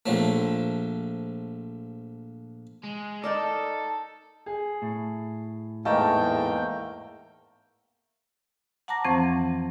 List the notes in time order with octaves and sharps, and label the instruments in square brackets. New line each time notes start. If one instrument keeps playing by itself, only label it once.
[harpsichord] A#1 F3 A3
[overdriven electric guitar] G#3
[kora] D#4 A#4 D5 [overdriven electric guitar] A4
[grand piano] G#4
[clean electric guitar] A2
[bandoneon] E2 G#2 G5 [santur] A3 A#3 A#4 [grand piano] D#5 A5
[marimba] F#5 A5 A#5 D6 A#6
F2 E3 F3 C4 C5 C#6